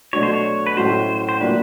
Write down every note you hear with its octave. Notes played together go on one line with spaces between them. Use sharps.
B2 F#3 A3 D4 F#4 C#5
C5
C#5
B4
A2 F#3 A3 C#4 F#4 C5
C5
A#2 F#3 A#3 D4 B4